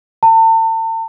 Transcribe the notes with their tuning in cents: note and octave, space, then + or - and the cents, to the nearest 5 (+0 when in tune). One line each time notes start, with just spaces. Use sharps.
A5 +40